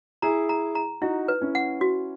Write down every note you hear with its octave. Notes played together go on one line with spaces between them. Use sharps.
E4 G#4 A#5
A#5
A#5
D#4 E4 F#4
B4
C#4 E4
F#5
F#4